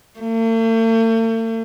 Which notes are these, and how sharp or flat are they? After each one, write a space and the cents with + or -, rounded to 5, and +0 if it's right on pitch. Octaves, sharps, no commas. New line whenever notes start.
A3 +45